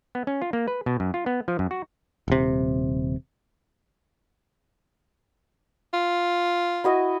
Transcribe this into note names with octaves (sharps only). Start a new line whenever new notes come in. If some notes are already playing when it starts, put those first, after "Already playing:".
B3
C#4
F4
A#3
B4
B2
F#2
F4
B3
F3
F#2
F#4
D#1 C3
F4
E4 F#4 D#5